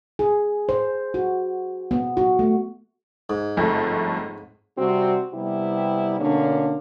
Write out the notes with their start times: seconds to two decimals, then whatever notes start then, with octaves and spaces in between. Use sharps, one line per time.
0.19 G#4
0.69 C5
1.14 F#4
1.91 B3
2.17 F#4
2.39 A3
3.30 G#2
3.57 G1 F2 A3
4.77 C3 G3 C4 F#4
5.33 C3 G3 B3 E4 G4
6.20 B2 D3 A#3 C#4 D4